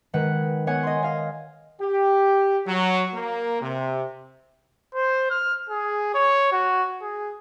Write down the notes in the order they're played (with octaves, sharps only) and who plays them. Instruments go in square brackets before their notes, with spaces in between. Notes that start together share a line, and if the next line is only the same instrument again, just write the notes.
[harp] D#3 G#3 B4 F#5
B3 C#5 F#5 G#5
D#5 C6
D#5 F5 G#5
[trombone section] G4
F#3
A#3
C3
[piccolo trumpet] C5
F6
G#4
C#5
F#4
G#4